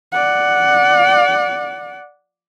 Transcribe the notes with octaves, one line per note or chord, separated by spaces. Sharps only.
D5 F#5